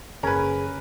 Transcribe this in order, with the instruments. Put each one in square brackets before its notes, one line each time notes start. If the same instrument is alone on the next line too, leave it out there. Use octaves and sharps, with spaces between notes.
[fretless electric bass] F#1 [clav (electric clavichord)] C#4 [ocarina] G#4 [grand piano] A#4 B4